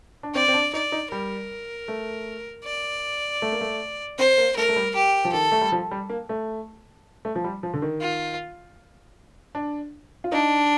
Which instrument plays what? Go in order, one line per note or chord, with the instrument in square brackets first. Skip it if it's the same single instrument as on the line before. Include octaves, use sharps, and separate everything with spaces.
[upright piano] D4
[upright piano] C4 [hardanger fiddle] D5
[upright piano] C4
D4
[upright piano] D#4 [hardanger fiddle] D5
[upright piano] D#4
[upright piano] G3 [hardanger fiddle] A#4
[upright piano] A3
[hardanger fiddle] D5
[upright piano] A3
A#3
A3
[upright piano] C4 [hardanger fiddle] C5
[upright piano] A#3
[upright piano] A3 [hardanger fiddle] A#4
[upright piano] A3
G3
[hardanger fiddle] G4
[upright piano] F3
[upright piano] D#3 [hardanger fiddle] A4
[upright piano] A3
G3
F3
G3
A#3
A3
A3
F3
G3
F3
D3
D#3
[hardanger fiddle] F4
[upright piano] D4
F4
[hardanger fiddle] D4 [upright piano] D#4